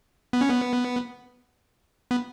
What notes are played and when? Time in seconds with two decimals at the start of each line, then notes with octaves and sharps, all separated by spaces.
0.33 B3
0.41 C#4
0.50 B3
2.11 B3